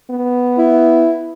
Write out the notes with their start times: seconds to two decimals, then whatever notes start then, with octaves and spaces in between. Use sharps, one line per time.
0.10 B3
0.58 E4